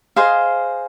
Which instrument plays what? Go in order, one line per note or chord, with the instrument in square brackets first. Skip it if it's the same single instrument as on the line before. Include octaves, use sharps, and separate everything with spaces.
[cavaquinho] G#4 C5 D#5 F5